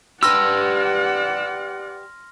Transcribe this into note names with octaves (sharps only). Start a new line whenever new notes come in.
G4 B4 D5 F#5 C6 E6 F6 A#6